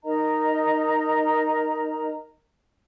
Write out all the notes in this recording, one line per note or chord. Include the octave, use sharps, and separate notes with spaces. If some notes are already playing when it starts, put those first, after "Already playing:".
D#4 A#4 D#5 A#5